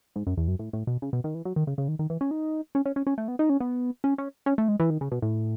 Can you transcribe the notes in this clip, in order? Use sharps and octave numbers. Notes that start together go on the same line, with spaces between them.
G#2
F#2
E2
F#2
A2
A2
B2
C#3
B2
D#3
E3
F#3
D#3
C#3
C#3
D#3
D#3
E3
C#4
D#4
C#4
C#4
C#4
C#4
A3
B3
D#4
C#4
B3
C#4
C#4
C#4
A3
G#3
E3
D#3
C#3
B2
A2